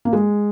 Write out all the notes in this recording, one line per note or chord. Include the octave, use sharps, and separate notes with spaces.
A#3
G#3